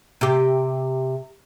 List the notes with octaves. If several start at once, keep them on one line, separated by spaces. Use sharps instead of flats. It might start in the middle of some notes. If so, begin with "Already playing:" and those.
C3 G4